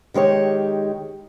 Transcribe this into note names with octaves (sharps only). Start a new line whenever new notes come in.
D#3 G#3 G4 C#5